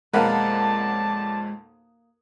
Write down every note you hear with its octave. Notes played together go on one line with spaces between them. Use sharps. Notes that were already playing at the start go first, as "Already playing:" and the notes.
B1 F2 G#3 A#3 B4 D5 F#5 A5